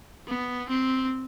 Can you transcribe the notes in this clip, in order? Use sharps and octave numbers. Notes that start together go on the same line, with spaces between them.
B3
C4